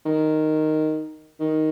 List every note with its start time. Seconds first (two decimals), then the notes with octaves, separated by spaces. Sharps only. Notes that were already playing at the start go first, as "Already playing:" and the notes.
0.05 D#3
1.40 D#3